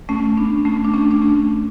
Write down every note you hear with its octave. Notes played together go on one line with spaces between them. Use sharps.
A3 C#4
B3 D4
A3 C#4
D4
A3 C#4
D4
A3 C#4